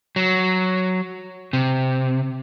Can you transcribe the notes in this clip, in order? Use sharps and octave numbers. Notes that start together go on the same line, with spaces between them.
F#3
C3